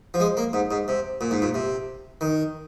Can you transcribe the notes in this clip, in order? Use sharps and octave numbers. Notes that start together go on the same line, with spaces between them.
F3
G#3
A#3
G#2
G#2
C3
A#2
G#2
A#2
C3
D#3